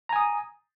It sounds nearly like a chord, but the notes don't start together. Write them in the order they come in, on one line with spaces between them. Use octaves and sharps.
A#5 G#5 D#6